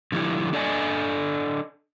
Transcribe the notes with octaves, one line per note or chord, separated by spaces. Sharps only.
D3 F3 G3 C4 E4
D4 A4 D5 D#5 G#5